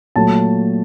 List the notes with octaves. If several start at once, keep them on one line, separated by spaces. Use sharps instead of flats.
A#2 F#3 A3 A5